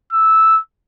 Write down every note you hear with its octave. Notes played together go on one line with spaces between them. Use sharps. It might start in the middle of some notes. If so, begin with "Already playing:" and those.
E6